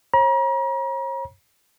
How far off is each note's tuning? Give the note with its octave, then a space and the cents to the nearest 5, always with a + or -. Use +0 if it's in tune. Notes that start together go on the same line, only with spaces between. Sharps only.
C#5 -45 A#5 +40